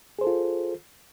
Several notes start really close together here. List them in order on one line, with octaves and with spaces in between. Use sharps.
G#4 C5 A4 F4